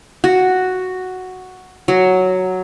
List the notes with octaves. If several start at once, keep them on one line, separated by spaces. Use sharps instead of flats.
F#4
F#3